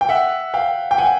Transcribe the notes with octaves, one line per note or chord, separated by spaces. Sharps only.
G5
E5 F#5
F5 G5
G5
F#5 G#5